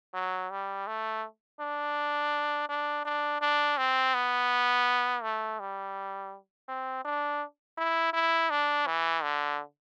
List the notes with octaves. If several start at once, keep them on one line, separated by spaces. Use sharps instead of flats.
F#3
G3
A3
D4
D4
D4
D4
C4
B3
A3
G3
C4
D4
E4
E4
D4
E3
D3